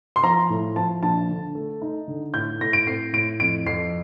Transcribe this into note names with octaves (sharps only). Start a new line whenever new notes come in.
C6
F3 A#5
A2
F3 A5
A#1 A5
D3
A3
D#4
D3
A2 G6
A2 A#6
D7
C4 C7
A2 D7
F2 D7
F2 C7